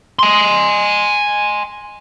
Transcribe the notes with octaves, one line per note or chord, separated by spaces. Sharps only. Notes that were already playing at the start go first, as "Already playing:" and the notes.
G#5 C6